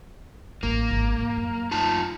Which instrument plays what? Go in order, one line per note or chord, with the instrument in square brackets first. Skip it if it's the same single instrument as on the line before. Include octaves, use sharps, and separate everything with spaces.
[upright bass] A1 [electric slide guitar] A#3
[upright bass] G#1
A#1
F#2
[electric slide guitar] D#4 F4 A5